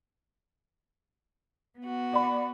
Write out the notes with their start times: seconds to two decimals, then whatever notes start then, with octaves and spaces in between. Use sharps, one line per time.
1.78 B3 F#4
2.13 D5 B5